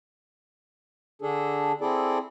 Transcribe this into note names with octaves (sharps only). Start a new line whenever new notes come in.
D3 D4 G#4 A4
C4 E4 G#4 A4 D5